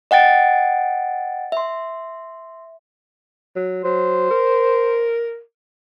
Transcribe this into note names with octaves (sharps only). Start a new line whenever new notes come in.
D#5 F#5 G5 A6 D7
E5 C6
F#3
F#3 C5
A#4